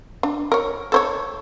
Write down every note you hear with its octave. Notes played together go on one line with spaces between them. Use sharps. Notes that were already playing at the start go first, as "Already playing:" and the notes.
D4
A#4 C#5
A4 C5 C#5